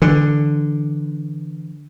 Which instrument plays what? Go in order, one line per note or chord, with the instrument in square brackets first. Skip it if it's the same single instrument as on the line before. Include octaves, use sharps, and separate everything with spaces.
[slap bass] D3 [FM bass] E3